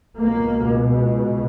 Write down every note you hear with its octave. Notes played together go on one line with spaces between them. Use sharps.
C#2 B2 A#3